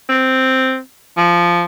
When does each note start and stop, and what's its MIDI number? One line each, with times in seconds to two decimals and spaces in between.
0.09 0.79 60
1.17 1.65 53